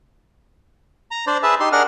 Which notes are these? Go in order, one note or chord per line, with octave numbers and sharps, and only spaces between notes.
A#5
D4 C5 D5
G#4 B4 E5 A5
D#4 G4 C6
D4 G#4 A#4 F#5 F6